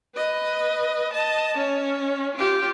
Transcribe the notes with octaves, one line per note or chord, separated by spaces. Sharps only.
B4 D#5
D#5 A5
C#4
F4 G4